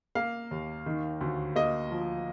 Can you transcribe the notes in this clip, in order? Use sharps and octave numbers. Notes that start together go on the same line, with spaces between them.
A#3 F5
D#2
D#3
D2
A#3 D#5
F3